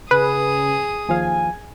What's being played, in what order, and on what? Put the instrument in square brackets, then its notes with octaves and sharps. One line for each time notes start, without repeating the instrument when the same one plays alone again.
[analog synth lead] C#3 [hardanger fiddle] G#4 D#6 [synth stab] B4
[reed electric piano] D#2 F3 F5 [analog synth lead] G#5